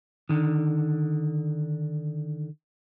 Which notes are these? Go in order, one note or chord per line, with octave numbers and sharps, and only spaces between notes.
D3 D#3